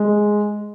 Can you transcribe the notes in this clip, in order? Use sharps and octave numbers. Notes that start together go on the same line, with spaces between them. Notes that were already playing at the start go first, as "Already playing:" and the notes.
Already playing: G#3